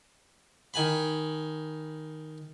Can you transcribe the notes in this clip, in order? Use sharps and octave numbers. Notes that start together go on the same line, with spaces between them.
D#3 G#5 B5